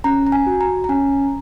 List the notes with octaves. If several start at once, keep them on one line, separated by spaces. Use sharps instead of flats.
C#4 A#5
A#5
G#5
F#4
A#5
A#5
C#4 G#5